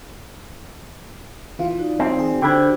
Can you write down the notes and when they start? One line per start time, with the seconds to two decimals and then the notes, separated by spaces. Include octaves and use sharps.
1.59 E3 F4
1.77 D#4 F#4 D5
2.00 C4
2.19 G#4
2.42 D3 F#4 G4 C5 G5 B5 G#6